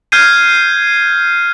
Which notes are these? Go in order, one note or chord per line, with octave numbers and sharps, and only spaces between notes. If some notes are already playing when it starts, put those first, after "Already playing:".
F6 G6 G#6 C7 D#7